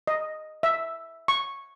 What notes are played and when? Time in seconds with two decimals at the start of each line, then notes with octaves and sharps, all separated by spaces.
0.07 D#5
0.63 E5
1.28 C#6